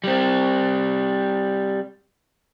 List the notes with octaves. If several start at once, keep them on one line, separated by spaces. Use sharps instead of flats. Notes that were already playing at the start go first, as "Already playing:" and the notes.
G3 C4